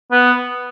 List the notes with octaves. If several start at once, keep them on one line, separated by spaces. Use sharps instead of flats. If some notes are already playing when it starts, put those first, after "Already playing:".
B3